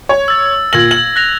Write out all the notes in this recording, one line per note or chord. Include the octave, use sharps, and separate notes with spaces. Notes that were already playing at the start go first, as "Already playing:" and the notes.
C#5
E6 A6
A#2 G#6 A#6 F#7
F#7
F#6 A#6 F7